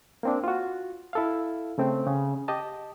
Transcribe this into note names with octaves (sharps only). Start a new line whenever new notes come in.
A#3 C4 D4
F4 F#4
E4 A4 F5
C#3 A3 C4
C#3
G4 D#5 A5